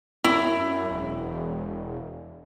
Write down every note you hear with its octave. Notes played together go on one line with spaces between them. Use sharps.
F#2 E4
E1